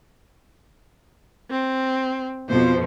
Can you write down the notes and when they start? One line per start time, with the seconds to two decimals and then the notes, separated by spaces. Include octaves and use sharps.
1.51 C4
2.49 F2 B2 F3 C5